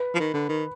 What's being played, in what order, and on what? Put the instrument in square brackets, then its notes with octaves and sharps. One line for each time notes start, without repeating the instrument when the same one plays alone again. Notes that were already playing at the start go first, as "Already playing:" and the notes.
Already playing: [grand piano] B4
[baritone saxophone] F3
D#3
D3
D#3